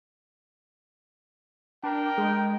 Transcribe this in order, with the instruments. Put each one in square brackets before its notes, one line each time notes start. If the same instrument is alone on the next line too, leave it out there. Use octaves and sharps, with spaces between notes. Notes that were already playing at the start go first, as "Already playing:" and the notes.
[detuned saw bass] D4 [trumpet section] A#4 G5
[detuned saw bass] G#3